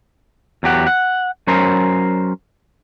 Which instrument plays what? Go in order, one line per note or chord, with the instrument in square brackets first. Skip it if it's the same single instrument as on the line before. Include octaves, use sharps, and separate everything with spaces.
[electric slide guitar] E2 F#3 G4 F#5
F#5
F#3 C#4 A#4 C5